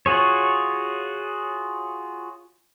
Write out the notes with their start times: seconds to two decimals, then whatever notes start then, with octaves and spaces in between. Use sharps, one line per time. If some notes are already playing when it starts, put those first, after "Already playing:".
0.06 F4 F#4 G#4 C#5